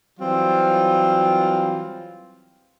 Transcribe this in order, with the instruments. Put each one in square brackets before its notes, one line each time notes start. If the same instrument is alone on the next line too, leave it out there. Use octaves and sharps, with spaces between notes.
[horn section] E3 F#3 G3 C4 F4